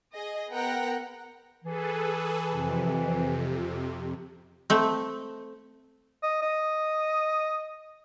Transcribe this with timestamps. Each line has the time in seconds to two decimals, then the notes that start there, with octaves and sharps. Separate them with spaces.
0.13 G#4 D#5
0.52 B3 A#4 F#5 G5
1.64 E3 G#4 A4 B4
2.51 F2 C3
4.70 A3 C4
6.23 D#5
6.42 D#5